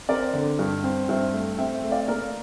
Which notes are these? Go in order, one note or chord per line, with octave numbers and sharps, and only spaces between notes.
C4 A#4 D5
D3
G2
C4
G2 C5 E5
A3
C4 E5 G5
E5 G5
A3
D5 F5
A#3 A#4 D5